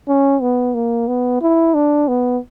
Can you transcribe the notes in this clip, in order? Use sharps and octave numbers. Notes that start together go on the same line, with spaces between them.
C#4
B3
A#3
B3
E4
D4
B3